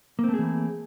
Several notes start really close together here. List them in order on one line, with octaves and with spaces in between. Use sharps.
A#3 C4 A3 G#4 E3